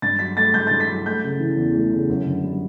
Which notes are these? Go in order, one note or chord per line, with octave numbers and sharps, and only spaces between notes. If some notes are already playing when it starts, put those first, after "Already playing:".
G2 A6
F#3 B6
A3 A6
G2 G6
G2 A6
B6
F#3
A3 G6
C#3
E3
E2
A3
C#3
F#2
D3
G3